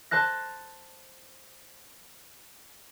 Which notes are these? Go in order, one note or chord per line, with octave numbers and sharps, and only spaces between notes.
C5 A5 F#6 A#6